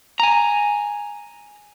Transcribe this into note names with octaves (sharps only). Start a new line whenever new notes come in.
G#5 A#5